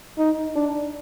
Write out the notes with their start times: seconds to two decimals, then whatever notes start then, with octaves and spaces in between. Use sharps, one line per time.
0.18 D#4
0.56 D4